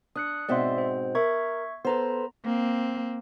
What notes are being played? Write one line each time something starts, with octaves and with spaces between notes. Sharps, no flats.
D4 D#6 F#6 C#7
G#2 B2 C4 D5 E5 C6
C5
A#4 E5 C#6 G#6
B3 A4 B4 C5 A#5
A#3 C4